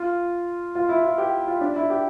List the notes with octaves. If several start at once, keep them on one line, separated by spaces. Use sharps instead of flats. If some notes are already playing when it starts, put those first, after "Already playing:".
Already playing: F4
F4
E4
F4
G4
F4
D4
E4
G4